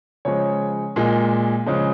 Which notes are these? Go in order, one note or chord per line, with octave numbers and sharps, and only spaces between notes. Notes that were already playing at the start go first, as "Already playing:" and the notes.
C#3 F3 G#3 C#5
A#2 G#3
C#3 F3 G#3 C#5